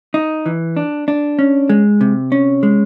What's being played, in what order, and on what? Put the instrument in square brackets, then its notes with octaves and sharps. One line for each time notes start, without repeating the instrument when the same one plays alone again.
[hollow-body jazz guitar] D#4
E3
D4
D4
C#4
G#3
C3
C#4
G#3